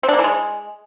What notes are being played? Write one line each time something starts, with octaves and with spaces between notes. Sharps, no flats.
C4
D4
A#3
E3
G#3